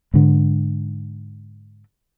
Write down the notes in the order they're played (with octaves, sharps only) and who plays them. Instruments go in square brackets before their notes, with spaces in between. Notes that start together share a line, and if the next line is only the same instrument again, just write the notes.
[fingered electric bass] G#2 D3